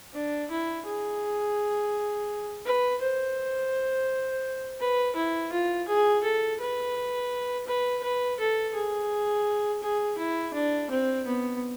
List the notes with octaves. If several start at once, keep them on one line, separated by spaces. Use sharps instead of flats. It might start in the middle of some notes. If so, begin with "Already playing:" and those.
D4
E4
G#4
B4
C5
B4
E4
F4
G#4
A4
B4
B4
B4
A4
G#4
G#4
E4
D4
C4
B3